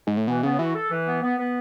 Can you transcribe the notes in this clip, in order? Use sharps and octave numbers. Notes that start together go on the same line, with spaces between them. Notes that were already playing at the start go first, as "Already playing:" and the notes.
G#2
A2
B2 E3
C#3 B3
E3 F#4
A4
E3
B3
B3
B3